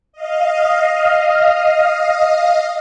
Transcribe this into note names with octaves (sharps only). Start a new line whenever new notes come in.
D#5 F5